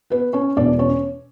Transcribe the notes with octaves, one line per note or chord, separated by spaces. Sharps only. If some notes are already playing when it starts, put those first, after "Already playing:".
B3 B4
C#4 C#5
E1 E2 B2 D4 D5
C#4 C#5